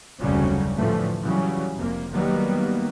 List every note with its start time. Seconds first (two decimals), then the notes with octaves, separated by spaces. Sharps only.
0.20 F1 D2 C#3 F#3 G3 C#4
0.76 A2 D3 E3 F3 A3
1.23 C#3 E3 F#3 G3 C#4
1.76 F1 C3 A#3
2.12 D#3 F#3 G3 A#3 B3